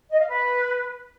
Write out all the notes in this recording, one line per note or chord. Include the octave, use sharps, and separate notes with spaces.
D#5
F5
B4